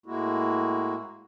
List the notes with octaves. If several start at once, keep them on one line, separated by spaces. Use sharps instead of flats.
A2 G#3 A#3 E4 F#4